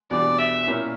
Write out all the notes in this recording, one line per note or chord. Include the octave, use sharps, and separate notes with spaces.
E2 B2 G3 B3 D4 D5
E5
A#2 A#3 C#4 E4